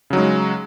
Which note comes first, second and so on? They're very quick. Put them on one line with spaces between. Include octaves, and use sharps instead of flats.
C#3 F#3 D#4 G#3